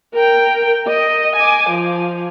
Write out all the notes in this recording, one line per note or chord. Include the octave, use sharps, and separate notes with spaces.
A#4 G5
D#5
G#5 D6
F3